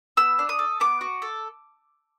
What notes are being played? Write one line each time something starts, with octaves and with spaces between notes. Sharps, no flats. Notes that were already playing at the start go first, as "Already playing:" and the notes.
B3 E6
D4
D#6
A4
B3 D6
F#4
A4